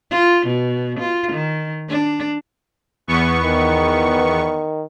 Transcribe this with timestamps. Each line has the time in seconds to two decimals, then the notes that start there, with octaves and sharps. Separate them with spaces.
0.11 F4
0.46 B2
0.99 F4
1.32 D#3
1.89 D4
3.07 E2 B3 C#6
3.43 D#3